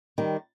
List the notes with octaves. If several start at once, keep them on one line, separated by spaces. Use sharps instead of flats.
D#3 G3